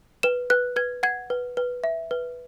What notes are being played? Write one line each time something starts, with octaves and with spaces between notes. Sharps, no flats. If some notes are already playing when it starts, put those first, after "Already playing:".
B4 E7
B4 F#6
B4 G#6
F#5 G#6
B4
B4
E5
B4